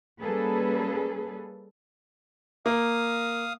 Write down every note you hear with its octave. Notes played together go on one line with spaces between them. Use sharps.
G3 A#3 C#4 G#4 A4 B4
A#3 F5 D#6